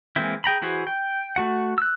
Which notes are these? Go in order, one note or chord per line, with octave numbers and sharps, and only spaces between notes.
E3 G#3 A#3 C4 E4
G#4 G5 A#5 B5
E3 E4 F#4 G#4 C5
G5
A3 F#4 F#5
E6 F#6